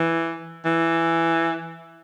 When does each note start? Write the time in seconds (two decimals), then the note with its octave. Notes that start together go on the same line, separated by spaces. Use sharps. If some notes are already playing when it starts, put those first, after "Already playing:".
Already playing: E3
0.65 E3